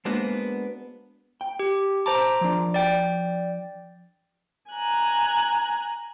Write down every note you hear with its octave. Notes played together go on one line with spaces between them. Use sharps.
G#3 A#3 B3 D4 F#4 C5
G5
G4
C5 A5 A#5 D6
F3 D4
D5 G5
G#5 A#5 F#6